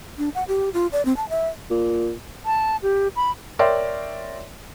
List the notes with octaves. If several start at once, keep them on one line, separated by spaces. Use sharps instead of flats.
D4
F#5
G4
F4
D5
C4
A5
E5
A#2
A5
G4
B5
A#4 C#5 D5 E5 G5 C6